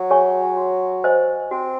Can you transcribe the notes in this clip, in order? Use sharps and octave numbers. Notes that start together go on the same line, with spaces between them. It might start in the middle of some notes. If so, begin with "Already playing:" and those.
Already playing: F#3
G#4 C#5 G#5 C#6
F#4
C5 D#5 G#5
C4 F#4